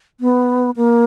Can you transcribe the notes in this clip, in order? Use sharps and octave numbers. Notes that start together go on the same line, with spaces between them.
B3
A#3